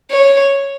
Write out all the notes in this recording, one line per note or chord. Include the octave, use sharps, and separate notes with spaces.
C#5